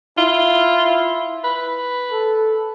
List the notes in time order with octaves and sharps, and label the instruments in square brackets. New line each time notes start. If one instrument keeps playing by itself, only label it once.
[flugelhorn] E4 [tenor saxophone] F4
[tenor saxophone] B4
[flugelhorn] A4